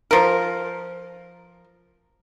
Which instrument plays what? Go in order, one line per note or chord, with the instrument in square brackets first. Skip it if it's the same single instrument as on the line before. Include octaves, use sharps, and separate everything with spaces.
[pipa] F3 A#4